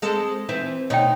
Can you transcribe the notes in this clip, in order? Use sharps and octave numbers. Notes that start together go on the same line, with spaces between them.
G#3 C4 A4
E3 C4 E4
D2 B2 D#4 C#5 G5